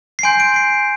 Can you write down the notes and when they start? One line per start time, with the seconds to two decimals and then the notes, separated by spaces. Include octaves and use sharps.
0.19 C7
0.23 G#5 C6 G6 D7
0.40 D7
0.56 C7